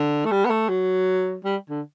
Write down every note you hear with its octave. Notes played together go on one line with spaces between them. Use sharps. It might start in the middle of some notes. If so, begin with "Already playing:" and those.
Already playing: D3
A3
G3
B3
A3
F#3
G3
D3